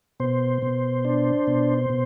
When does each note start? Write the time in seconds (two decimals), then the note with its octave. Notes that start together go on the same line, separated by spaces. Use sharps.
0.20 B2 C5
0.62 B2
1.05 D4
1.47 B2
1.90 B2